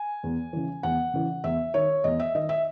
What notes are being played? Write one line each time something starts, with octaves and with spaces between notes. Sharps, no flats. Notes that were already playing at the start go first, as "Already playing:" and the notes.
Already playing: G#5
E2
C#3 E3
E2 F#5
C#3 E3
E2 E5
D#3 C#5
E2 D#5
E5
D#3 D#5
E5